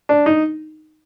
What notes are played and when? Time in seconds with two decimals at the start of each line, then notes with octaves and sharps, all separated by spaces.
0.09 D4
0.26 D#4